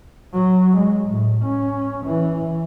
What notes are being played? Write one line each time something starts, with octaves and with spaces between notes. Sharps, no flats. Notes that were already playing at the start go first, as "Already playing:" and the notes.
F#3
G#3
A2
C#4
E3